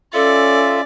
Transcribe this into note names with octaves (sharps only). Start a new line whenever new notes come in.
C#4 F4 A4 D5 E5